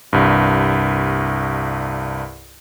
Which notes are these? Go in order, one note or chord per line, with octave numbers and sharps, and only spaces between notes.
C2 G2